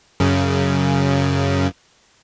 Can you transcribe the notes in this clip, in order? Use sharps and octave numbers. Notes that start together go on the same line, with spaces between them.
F#2 C#3